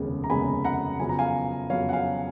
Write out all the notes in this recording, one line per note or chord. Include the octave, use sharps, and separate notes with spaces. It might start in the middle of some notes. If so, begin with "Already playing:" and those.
Already playing: F1 D#2 C#3 G#3 B3
A#5
F1 D#2 C#3 G#3 B3 G#5 B5
F#5 A#5
F2 C#3 F#3 B3 G#5
A#5
F5 G#5
F2 C#3 F#3 B3 C#5 F5
F#5
F5 G#5